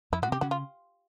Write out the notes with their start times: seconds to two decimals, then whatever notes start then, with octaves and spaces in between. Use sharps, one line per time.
0.12 F2 F3 E4
0.22 A2 A3 F#4
0.32 C3 C4 G4
0.41 C#3 C#4 F#4
0.51 F4